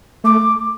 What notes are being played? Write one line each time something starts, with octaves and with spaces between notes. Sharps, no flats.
A3 D6